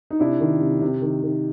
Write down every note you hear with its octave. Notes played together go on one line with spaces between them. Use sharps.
D#4
C3 D4 E4
D#3
C3
C3
D#3
D#3